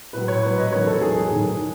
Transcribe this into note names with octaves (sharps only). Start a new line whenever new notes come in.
A2 F#3 B4
C#5
A2 F#3 B4
D#5
B4
E2 D#3 F#3 C#5
A4
E2 D#3 F#3 G#4
G#2 D#3 F#3